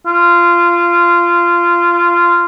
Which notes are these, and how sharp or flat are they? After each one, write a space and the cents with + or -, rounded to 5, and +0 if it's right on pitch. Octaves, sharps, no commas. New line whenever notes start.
F4 -15